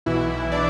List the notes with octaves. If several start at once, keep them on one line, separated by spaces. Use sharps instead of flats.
B1 B2 E3 E4
D4 D5